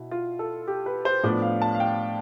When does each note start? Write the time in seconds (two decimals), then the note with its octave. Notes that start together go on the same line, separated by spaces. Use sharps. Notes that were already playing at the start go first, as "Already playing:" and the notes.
Already playing: B2 E4
0.11 F4
0.39 A4
0.67 G4
0.86 B4
1.05 C5
1.23 A2 F3 B3 D4 D5
1.42 F5
1.62 A5
1.75 F5
1.80 G5